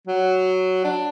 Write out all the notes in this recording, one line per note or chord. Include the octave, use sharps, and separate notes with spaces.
F#3
D4